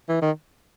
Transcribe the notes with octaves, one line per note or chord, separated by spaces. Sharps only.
E3
D#3